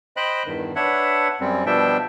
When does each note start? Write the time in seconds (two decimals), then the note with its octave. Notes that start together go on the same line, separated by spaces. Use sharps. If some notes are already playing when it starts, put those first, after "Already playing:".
0.17 C5 D#5 G5 B5 F#6
0.45 E2 G2 D#3
0.76 D4 B4 C#5 E5 F#5
1.40 F#2 G3 C4
1.66 B2 F3 G3 D4 E5 G5